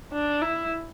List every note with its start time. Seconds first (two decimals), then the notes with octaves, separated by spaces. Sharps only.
0.13 D4
0.41 E4